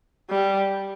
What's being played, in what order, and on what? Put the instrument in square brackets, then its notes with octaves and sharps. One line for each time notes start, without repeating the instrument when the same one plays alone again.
[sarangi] G3